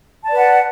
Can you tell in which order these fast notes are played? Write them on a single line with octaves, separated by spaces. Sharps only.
A5 D5 B4 F#5